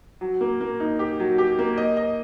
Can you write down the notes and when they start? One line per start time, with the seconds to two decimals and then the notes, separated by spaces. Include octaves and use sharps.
0.21 F#3
0.41 A#3
0.61 A#3
0.80 D#4
0.99 G4
1.20 F#3
1.38 G4
1.59 A#3
1.78 D#5
1.97 D#5